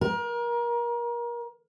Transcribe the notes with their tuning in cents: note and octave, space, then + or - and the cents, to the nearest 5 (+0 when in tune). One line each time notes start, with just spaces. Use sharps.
A#4 +30